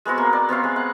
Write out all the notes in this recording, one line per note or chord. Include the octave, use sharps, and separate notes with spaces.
G#3 B3 C4 F#4
A#3
D5
B3 C4 C#5 F5
G#3
F#5